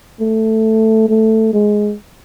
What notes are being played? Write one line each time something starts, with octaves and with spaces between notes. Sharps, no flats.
A3
A3
G#3